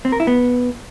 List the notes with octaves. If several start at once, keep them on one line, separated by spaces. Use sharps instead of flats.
C4
A#4
E4
B3